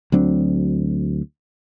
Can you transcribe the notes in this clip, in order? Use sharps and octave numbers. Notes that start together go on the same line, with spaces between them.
D2 F#3 C4 D4